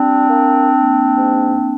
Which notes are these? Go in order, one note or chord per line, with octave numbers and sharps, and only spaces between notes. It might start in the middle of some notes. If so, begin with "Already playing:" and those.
Already playing: G3 C4 D4
A#3
A#3
G#2